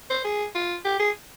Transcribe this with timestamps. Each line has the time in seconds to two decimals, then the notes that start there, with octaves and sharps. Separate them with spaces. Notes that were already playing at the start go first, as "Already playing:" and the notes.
0.10 C5
0.24 G#4
0.55 F4
0.85 G4
0.99 G#4